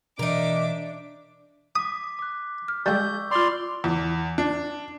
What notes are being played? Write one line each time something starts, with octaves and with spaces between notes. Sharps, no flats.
B2 E3 D4 D#4 A#4 E5 D6
D6 D#6 B6
D6 F#6
F6
G3 G#3 C#6 E6 G6
F4 D5 B5 C6 D6 F7
E2
D4